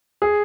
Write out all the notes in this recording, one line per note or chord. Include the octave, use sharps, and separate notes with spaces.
G#4